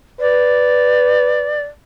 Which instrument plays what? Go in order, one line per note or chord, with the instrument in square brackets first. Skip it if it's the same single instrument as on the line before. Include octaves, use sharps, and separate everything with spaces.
[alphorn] B4 [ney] D5